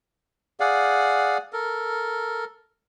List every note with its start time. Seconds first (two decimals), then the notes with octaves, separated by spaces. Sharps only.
0.60 G#4 D5 F5 F#5
1.53 A4 A#4